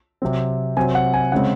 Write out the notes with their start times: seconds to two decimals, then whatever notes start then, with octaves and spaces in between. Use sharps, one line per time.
0.22 C3 F#3 C4
0.77 C3 F#3 C4 G#5
0.95 F#5
1.14 G#5
1.32 C#3 G#3 C4 F#5